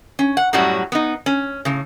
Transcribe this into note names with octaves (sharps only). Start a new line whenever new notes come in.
C#4
F#5
F#2 A2 F#3 G3 F#4
B3 D#4
C#4
A2 C#3